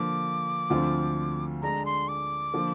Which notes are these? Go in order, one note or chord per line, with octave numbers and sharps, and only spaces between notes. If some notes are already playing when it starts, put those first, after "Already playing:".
Already playing: D3 F3 A#3 D6
D2 D3 F3 C4 F4
D3 G#3 D4 A#5
C6
D6
D3 F3 A#3